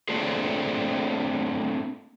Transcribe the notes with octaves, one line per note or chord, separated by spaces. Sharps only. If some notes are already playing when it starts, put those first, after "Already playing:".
A3 A#3 C4 D4 F4 G#4